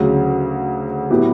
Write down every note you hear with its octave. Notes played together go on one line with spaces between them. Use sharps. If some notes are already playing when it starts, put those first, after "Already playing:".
Already playing: D2 C#3 F#3
A2 F#3 B3 E4 G4